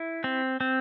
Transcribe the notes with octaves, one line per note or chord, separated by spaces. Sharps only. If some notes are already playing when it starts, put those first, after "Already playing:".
Already playing: E4
C4
C4